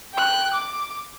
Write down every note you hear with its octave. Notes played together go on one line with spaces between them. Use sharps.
G5 F#6
D6